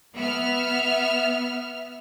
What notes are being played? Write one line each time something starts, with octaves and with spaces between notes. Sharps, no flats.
B3 E5 F6